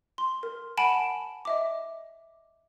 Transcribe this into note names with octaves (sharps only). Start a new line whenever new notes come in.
C6
A#4
F#5 G#5 A5 B5 D7 E7
D#5 E5 D6